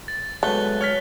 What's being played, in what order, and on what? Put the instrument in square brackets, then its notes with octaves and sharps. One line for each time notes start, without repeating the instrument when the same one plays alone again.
[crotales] A6
[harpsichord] F#3 G#3 B3 [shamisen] A3 [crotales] F#6 G7
[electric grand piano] C#5 F6 B6